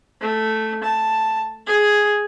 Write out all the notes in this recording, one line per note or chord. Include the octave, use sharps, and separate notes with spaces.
A3
A5
G#4